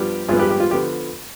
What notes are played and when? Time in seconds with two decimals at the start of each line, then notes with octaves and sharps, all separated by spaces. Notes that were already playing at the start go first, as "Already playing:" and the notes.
Already playing: G2 F3 B3 G4
0.28 G#1 G2 F3 B3 F4 G#4
0.39 G4 B4
0.50 G4
0.60 F4
0.71 D3 F3 B3 G4